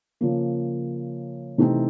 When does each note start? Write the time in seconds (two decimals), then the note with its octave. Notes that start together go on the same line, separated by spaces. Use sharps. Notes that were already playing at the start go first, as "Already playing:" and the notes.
0.21 C#3 F3 A#3
1.58 C3 E3 A3 C4 D#4